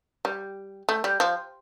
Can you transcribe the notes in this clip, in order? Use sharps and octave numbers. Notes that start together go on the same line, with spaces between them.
G3
A3
G3
F3